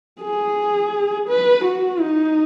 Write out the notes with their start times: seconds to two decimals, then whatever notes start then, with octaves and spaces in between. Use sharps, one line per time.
0.22 G#4
1.28 B4
1.64 F#4
2.00 D#4